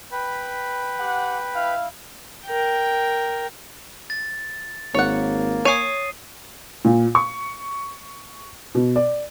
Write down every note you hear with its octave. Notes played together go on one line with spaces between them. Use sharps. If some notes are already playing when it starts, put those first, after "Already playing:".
B4 G5 B5
G4 F#5
E4 F5
A#4 G5
A6
G#1 A#3 C#5 F#5
C#5 G#5 D#6 C7 D#7
A#2
C#6
B2
D5